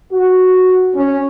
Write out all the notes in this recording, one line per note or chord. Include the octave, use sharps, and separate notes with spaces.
F#4
C#4